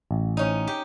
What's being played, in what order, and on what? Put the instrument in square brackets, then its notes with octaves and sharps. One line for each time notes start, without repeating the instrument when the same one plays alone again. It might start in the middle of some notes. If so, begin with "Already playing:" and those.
[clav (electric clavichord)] A1
[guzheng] C#4 D#4
G4